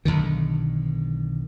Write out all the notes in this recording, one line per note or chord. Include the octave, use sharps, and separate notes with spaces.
B1 B2 D3 D#3